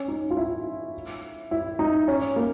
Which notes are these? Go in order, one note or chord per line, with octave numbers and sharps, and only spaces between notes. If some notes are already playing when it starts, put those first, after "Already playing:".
Already playing: C#4
D#4
F4
E4
E4
D#4
C#4
A#3